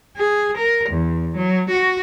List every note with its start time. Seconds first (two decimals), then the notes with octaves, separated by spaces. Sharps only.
0.17 G#4
0.57 A#4
0.89 E2
1.36 F#3
1.69 F#4